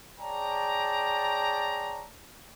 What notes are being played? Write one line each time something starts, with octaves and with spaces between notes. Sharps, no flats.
G#4 C#5 D5 G5 A5 A#5